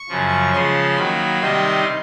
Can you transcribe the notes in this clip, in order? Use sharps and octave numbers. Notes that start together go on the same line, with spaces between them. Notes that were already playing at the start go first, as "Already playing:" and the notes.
Already playing: C#6
F#2 C#3 F3
C#3 F3 G#3 C#4 C6
D#3 F#3 A#3 B5
C3 D#3 G3 C4 D#4 C6